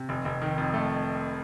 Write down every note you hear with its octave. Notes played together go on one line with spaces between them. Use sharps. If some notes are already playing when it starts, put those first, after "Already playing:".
Already playing: C3
F1
F1
D#3
F2
A3